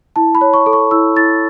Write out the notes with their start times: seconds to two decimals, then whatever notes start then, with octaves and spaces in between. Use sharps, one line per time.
0.16 E4 A5
0.35 B5
0.41 C#5
0.54 C#6
0.66 A4
0.73 C#6
0.91 E4 E6
1.16 E4 A6